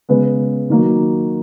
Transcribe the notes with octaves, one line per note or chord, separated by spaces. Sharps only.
C#3 G#3 B3 B4
D#3 F#3 A#3